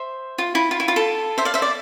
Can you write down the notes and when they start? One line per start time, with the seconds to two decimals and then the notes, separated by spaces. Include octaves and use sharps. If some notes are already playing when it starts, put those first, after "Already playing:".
Already playing: C5 E5
0.38 F4
0.55 E4
0.71 F4
0.80 E4
0.88 F4
0.96 A4
1.38 C5 E5
1.45 D5 F5
1.54 C5 E5
1.62 D5